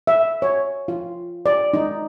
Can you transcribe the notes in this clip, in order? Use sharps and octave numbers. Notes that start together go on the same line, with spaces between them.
E5
C#5
F4
D5
D#4